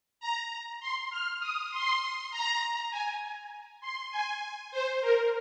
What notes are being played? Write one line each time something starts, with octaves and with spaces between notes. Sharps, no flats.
A#5
C6
F6
D#6
C6
A#5
G#5
C6
G#5
C5
A#4